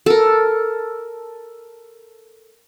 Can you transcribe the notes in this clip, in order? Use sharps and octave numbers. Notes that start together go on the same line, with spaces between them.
A4 A#4